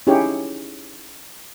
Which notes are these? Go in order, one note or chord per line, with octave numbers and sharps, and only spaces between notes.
C#4 D#4 E4 G4 G#4 C#5